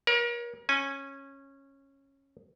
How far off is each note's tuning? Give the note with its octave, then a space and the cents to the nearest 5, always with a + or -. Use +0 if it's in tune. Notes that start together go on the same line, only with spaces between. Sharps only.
A#4 +35 C#5 +0
C#4 -15 G#5 +0